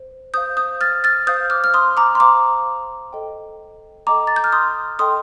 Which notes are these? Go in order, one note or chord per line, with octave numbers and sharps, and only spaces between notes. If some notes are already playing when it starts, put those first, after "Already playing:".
Already playing: C5
C5 F5 D#6 G6
D#6 G6
F6 A6
F6 A6
C5 F5 D#6 G6
D6 F6
F6
C6 D#6
A#5 D6
C6
C5 F5 A#5 D6
A4 D#5 G5
A4 D#5 G5 A#5 D6
A6
G6
F6
C6 D#6
A4 D#5 G5 C6 D#6